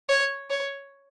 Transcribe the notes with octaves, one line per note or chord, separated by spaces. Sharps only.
C#5
C#5